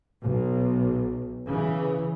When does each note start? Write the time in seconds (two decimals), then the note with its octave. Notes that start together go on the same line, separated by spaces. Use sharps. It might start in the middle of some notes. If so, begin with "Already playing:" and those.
0.21 B1
1.47 C#3 E3